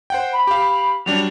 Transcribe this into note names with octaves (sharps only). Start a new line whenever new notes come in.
C5 F#5 G5
B5
G4 F5
F#3 G3 D4 F7